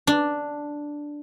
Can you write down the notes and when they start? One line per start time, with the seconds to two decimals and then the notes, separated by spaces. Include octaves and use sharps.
0.07 D4